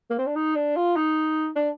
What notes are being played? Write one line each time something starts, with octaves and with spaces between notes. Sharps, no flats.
A#3
C4
D4
D#4
D4
F4
D#4
D4